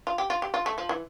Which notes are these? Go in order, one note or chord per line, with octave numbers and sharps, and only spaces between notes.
F4
G4
F4
G4
F4
A3
F3
E3